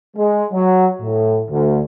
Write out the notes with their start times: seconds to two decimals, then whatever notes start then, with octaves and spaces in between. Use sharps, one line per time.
0.17 G#3
0.52 F#3
1.01 A2
1.50 D2